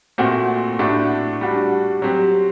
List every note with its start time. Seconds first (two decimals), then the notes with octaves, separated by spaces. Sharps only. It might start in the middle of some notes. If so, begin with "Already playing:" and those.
0.18 A#2 A3 C4 F#4
0.79 A2 A3 D4 F#4
1.41 G3 D4 F#4
2.02 F#3 C4 G4